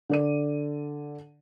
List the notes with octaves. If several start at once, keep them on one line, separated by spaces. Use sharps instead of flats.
D3 D5 D#7